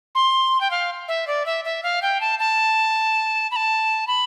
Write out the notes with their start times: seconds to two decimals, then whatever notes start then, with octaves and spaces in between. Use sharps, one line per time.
0.15 C6
0.61 G5
0.71 F5
1.08 E5
1.27 D5
1.46 E5
1.65 E5
1.83 F5
2.02 G5
2.21 A5
2.39 A5
3.51 B5
3.56 A5
4.07 B5